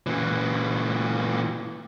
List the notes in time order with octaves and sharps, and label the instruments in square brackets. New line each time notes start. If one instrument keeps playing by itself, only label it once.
[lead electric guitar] A#2 E3